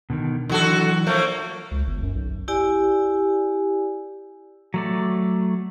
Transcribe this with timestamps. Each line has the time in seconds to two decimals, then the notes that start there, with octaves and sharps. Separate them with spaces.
0.10 B2 D3 D#3
0.50 D3 E3 F#3 F#4 A4
1.07 F3 A3 A#3 C#5 D5
1.71 C#2
1.87 G1
2.03 F#2
2.15 B1
2.48 E4 G4 D5 G#5
4.74 F#3 A3 D5